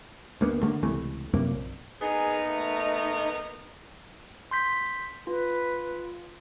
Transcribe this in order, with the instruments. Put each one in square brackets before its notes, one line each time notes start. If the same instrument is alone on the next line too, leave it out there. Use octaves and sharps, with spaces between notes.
[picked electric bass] D2 A#3 B3
D3 A3 A#3
C#2 C3 E3 A3
C2 F#2 C3 A#3
A#1
[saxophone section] A#3 B3 D#4 [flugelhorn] G#4
[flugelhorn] A3
[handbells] C6 G6 B6
[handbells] F4 [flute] B4